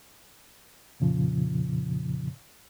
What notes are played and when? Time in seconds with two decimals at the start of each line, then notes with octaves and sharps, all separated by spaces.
1.00 F2 A#2 C#3 F3